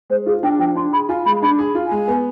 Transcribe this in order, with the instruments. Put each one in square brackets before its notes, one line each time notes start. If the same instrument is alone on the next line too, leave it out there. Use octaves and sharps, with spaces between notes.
[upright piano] G#3 [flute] C5
[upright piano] F4 [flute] G#4
[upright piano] D4 [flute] G5
[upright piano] F3 [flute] G5
[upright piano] D4 [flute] C6
[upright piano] G#4 [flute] B5
[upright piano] F4 [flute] G#5
[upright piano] G#3 [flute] B5
[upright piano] D4 [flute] B5
[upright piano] G#4
F4
[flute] G#5
[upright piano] G#3
B3